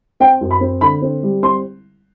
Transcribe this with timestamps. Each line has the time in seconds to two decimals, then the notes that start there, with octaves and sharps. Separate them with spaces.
0.20 C4 G5
0.41 F#2
0.51 B5
0.61 C4
0.81 D3 B5
1.02 C4
1.23 G3
1.43 C4 C6